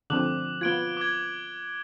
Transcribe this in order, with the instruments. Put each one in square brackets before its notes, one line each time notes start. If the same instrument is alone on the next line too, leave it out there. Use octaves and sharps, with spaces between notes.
[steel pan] D3 F3 C4 [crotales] D6 F#6 F#7
[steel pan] B3 F4 [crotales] G#6 D7 G7
[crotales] D6 G#6